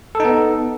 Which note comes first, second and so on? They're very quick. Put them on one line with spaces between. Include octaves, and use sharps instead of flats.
A4 D#4 B3